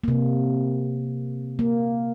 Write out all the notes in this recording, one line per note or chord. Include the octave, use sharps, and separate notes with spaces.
C3 A#3
A#3